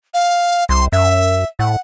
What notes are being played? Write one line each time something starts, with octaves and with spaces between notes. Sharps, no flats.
F5
C2 C6
F#2 E5
A2 F#5